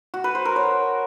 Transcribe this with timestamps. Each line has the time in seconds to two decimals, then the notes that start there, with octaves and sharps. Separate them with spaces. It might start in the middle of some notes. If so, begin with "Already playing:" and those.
0.14 F#4
0.24 B4
0.35 C5
0.45 A#4
0.56 C#5